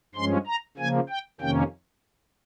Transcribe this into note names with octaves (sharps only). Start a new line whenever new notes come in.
G2 F3 G#3 C#4 C6
A#5
C#3 F3 A#3 G#5
G5
F2 C3 D#3 A#3 C#4 G5